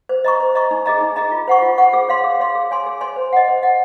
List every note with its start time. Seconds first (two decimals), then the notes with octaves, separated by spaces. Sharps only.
0.09 C5
0.24 D#5 A#5 C#6
0.40 C5
0.55 D#5 A#5 C#6
0.71 D#4
0.86 G#4 D#5 A#5
1.01 D#4
1.16 G#4 D#5 A#5
1.32 F4
1.48 C5 F#5 C#6
1.62 F4
1.78 C5 F#5 C#6
1.93 G#4
2.09 C#5 F5 C6
2.24 G#4
2.40 C#5 F5 C6
2.55 G#4
2.71 C#5 G#5 C6
2.86 G#4
3.01 C#5 G#5 C6
3.16 C5
3.33 D#5 F#5
3.48 C5
3.62 D#5 F#5